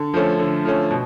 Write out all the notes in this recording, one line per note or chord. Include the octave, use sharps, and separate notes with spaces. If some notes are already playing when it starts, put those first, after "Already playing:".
Already playing: D3
F3 A3 C#4
D3
F3 A3 C#4
B2